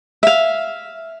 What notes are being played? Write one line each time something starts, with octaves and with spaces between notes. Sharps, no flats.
E5 F5